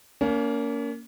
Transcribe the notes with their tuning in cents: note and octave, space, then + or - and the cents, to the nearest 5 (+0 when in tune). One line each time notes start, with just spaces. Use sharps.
A#3 -5 C#4 +35